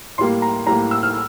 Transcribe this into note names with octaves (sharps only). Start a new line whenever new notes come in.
A2 G3 A#3 C6
A#5
A2 G3 A#3 A#5
E6
F6